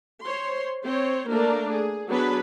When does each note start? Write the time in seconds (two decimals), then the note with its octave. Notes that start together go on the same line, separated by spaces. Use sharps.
0.22 C5 C#5 C6
0.83 C4 C5 C#5
1.28 A3 A#3 D4 A#4
1.71 G#4
2.09 F#3 B3 D4 G#4 B4 B5